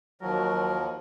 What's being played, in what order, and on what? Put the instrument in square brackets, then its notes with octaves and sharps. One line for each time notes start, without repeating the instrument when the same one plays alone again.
[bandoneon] D#2 F3 [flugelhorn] F#3 [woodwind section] F#4 A#4